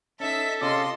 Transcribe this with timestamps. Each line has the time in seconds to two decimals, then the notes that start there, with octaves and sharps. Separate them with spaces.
0.20 C#4 D#4 A4 E5 B6
0.61 C3 C#4 F4 G#4 D#5 C6 D6